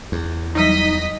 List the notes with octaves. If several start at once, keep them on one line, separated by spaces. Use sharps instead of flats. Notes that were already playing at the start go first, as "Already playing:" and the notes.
E2
E3 F#3 G3 D#4 D#5 B6